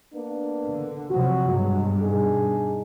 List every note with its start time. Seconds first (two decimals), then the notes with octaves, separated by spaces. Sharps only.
0.14 A#3 B3 D4
0.68 D3
1.11 C3 F3 F#3 F#4
1.49 G2 B2 F#3 G#3
2.01 D4 D#4 G#4